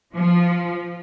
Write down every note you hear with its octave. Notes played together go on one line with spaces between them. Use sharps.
F3